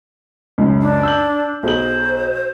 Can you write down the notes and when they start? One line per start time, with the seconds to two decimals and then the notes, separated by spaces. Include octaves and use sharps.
0.58 C#2 F#2
0.81 D4
1.03 E6 G6 F#7
1.63 B1 G#4 C5 F#7